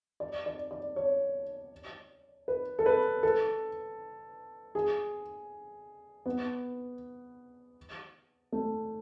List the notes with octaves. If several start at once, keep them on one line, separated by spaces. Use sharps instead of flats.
D5
D5
D5
C#5
B4
A4
B4
A4
G#4
B3
A3